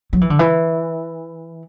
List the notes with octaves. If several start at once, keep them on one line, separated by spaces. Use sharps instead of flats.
F#3
E3
D3
E3